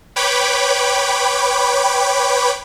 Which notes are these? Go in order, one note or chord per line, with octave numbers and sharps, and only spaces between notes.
B4 C#5 G5 B5 D6